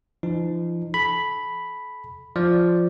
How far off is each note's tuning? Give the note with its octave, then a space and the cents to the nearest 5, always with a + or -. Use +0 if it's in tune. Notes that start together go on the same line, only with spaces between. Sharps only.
F3 -40 D#4 -25
A4 -35 B5 +0
F3 +0 D5 +0